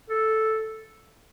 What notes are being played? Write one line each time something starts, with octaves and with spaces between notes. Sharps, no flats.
A4